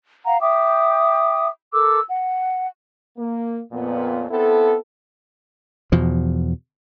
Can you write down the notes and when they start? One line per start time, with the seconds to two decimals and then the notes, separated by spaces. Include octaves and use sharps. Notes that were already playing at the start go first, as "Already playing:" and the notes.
0.25 F5 F#5 A#5
0.40 E5 G5 D6 D#6
1.73 A4 A#4 D6 E6
2.09 F#5
3.18 A#3
3.72 F2 A#2 B3
4.31 B3 C4 E4 A4
5.92 E2 B2 F3